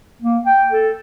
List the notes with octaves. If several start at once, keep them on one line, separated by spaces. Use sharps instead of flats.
A#3
G5
A4